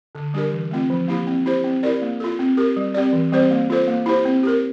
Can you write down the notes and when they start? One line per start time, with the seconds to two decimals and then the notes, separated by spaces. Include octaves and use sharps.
0.15 D3
0.34 G3 D4 G4 A#4
0.52 E3
0.71 A3 C4 F4
0.90 F3
1.08 A#3 E4 G4
1.27 C4
1.46 E4 G4 C5
1.64 C4
1.83 E4 G4 A#4 D5
2.02 A#3
2.20 F4 A4
2.39 C4
2.57 G4 A#4
2.76 G3
2.94 C4 G4 D5
3.13 E3
3.32 G3 C4 G4 C5
3.51 A#3
3.70 F4 A4 C5
3.88 A#3
4.06 E4 G4 C5
4.25 C4
4.43 G4 A#4